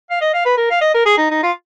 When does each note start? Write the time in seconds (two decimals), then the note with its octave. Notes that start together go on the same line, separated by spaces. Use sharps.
0.10 F5
0.21 D#5
0.34 F5
0.45 B4
0.58 A#4
0.70 F5
0.81 D#5
0.94 A#4
1.06 G#4
1.18 D#4
1.31 D#4
1.43 F4